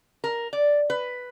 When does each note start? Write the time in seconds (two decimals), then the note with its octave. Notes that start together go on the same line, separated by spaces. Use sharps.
0.24 A#4
0.53 D5
0.90 B4